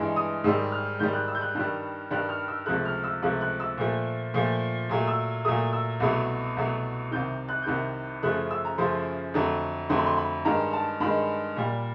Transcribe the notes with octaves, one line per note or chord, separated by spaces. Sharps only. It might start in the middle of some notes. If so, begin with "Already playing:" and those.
Already playing: G2 E3 G#3
D#6
G#2 D#3 G3 E6
F6
G#2 D#3 G3 G6
F#6
E6
G6
F#6
G2 D#3 G3 F#6
G2 D#3 G3 F#6
F6
E6
C#2 C3 F3 A3 F#6
F6
E6
C#2 C3 F3 A3 F#6
F#6
E6
A#2 F3 A3
A#2 F3 A3
A#2 F#3 A3
E6
A#2 F#3 A3 D#6
E6
C2 B2 F#3 A3
C2 B2 F#3 A3
C2 C3 D#3 G6
F#6
G6
C2 C3 D#3 F#6
F#2 C#3 F3 A3 F#6
E6
A#5
F#2 C#3 F3 A3 C6
F2 D3 F#3 A3
F2 D3 F#3 A3 C6
B5
C6
B5
G2 D#3 G#3 A#5
A5
G2 D#3 G#3 B5
A#2 G3